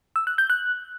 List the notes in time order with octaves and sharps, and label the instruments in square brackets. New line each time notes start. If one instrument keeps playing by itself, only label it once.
[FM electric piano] E6
F#6
G6
F#6